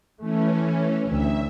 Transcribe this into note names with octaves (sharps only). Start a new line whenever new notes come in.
E3 A3 C#4
D2 E5